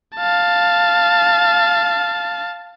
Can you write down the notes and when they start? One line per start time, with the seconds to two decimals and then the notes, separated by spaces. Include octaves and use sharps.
0.17 F5 A5